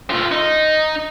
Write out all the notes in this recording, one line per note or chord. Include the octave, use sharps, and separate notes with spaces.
A3 F4
D#4